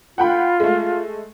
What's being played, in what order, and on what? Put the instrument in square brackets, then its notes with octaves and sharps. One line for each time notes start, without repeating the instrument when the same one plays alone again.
[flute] F4 [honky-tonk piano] F#5 G5 B5
[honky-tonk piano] G#3 A3